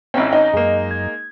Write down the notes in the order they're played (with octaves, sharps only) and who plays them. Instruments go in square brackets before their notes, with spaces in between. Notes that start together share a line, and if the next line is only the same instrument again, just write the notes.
[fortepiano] G#1 C#4 [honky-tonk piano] C4 D#4 E4
[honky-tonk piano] D#4 [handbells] D#5
[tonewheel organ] F#2 [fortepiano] G#3 A#3
[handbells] G#6